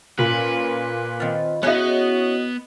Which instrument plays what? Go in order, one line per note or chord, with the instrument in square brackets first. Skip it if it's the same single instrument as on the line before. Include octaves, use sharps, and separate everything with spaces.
[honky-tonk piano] A#2 [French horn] C#4 [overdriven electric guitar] B4
[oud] D#3 F4 [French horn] C4
[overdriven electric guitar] B3 [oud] C#4 E4 G#4 [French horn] F#4 [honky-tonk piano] D#5 F#6